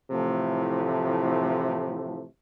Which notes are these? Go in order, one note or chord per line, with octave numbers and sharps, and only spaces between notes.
A2 C3 E3 F3 A3